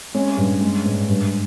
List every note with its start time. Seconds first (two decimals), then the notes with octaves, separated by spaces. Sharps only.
0.14 G#3 C#4
0.37 G2
0.61 G#3
0.85 G#2
1.08 G2